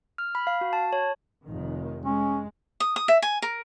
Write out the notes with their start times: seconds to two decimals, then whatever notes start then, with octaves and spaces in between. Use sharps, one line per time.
0.18 F6
0.35 B5
0.47 F5
0.61 F#4
0.73 A5
0.93 C#5
1.46 F1 D#3
2.05 G#3 C#4
2.80 D#6
2.96 D#6
3.08 E5
3.22 G#5
3.42 A#4